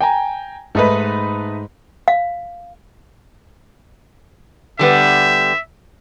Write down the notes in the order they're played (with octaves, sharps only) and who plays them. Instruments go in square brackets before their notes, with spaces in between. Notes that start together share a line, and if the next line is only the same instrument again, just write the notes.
[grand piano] G5 G#5 A#5
[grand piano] G#2 [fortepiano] A3 D#4 B4
[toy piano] F5
[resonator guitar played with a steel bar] D3 G3 B3 [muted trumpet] E5